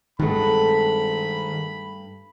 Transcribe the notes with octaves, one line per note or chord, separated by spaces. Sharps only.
G2 D#3 G#3 A3 B3 B5